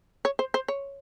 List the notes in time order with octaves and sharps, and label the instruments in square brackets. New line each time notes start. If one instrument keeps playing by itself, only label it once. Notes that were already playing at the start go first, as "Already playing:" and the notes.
[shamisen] C#5
C5
C5
C#5